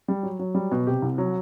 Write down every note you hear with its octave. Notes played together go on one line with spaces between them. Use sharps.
G3
F#3
F#3
G3
B2
C3 G4
C2
F#3